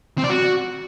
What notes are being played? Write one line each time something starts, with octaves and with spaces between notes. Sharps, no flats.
C4
D5
F#4